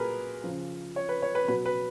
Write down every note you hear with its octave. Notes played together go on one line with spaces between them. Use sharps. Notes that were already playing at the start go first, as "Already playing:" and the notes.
Already playing: A#2 F#3 G#4 A#4 B4
C#3 F3
C#5
B4
C#5
B4
B2 F#3 B4
B4